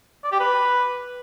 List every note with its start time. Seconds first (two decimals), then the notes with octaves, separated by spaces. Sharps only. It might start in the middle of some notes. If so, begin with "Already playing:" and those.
0.24 D5
0.32 G4
0.40 B4